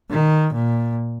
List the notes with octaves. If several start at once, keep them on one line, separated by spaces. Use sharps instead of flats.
D#3
A#2